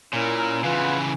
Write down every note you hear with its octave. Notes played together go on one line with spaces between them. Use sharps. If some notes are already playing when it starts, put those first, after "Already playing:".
A#2 C#4 E4 A#4
C#3 E3 F4 B4 F#5